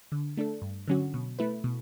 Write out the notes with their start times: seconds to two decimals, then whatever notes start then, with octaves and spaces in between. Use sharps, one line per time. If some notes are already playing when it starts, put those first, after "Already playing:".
0.12 D3
0.37 A3 D4 A4
0.62 G2
0.88 D3 F#3 C#4 F#4
1.14 B2
1.39 A3 E4 B4
1.64 B2